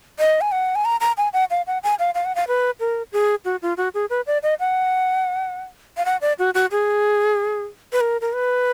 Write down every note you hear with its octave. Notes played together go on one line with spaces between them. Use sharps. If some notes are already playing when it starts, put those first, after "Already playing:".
D#5
G#5
F#5
G#5
A#5
A#5
G#5
F#5
F5
F#5
G#5
F5
F5
F#5
F5
B4
A#4
G#4
F#4
F4
F#4
G#4
B4
D5
D#5
F#5
F5
F#5
D5
F#4
F#4
G#4
B4
A#4
A#4
B4